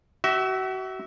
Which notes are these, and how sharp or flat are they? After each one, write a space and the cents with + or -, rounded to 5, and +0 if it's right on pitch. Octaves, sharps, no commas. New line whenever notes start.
F#4 +35 E5 -10